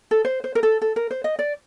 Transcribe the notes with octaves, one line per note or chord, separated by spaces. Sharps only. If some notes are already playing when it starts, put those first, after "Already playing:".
A4
C5
C5
A#4
A4
A4
A#4
C5
D#5
D5